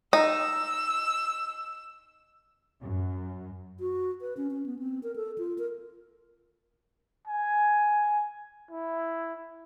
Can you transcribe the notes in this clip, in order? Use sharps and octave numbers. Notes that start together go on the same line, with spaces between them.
D#4 E6
F#2
F#4
B4
C#4
C#4
B3
C4
A#4
A4
F4
A#4
G#5
E4